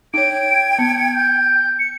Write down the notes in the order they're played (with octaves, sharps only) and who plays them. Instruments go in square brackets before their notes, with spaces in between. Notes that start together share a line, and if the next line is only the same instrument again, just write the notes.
[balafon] D#4 C#5 [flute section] G5 G#6 [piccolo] D7
[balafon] B3 [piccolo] C#7
[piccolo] G6
C#7